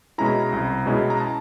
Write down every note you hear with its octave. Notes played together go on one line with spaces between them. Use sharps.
B2 G#3 C#4 E4 A#5
C2
B2 G#3 C#4 E4
A#5
A5